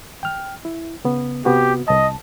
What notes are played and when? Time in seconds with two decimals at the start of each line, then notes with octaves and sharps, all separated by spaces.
0.23 G5 F6
0.65 E4
1.05 C#3 B3
1.45 C3 B3 F#4 G4
1.88 C2 D#5 A5